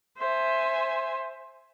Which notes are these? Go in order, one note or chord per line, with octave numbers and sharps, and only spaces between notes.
C5 E5 G#5